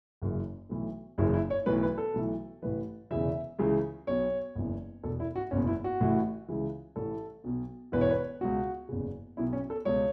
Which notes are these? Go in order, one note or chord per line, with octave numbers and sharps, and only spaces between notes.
F#1 F#2 C#3 E3
B1 A2 E3
F#1 F#2 C#3 E3 E4
E4
C#5
B1 A2 E3 B4
B4
A4
B1 A2 E3
A1 A2 E3 B4
E1 E2 C#3 E3 E5
C#2 C#3 E3
B1 B2 C#5
F#1 E2 E3
E1 E2 B2 A4
E4
F#4
F#1 E2 B2 C#4
E4
F#4
A1 A2 E3
C#2 C#3 E3
A1 A2 E3 A4
B1 B2
E1 E2 E3 B4
C#5
B4
C#2 B2 F#4
F#1 E2 C#3
B1 B2 E4
C#4
A4
C#2 B2 C#5